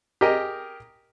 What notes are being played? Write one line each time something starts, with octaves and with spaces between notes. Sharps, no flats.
G4 G#4 A#4 D#5